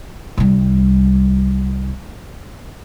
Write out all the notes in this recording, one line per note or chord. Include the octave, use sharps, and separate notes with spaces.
C2 G3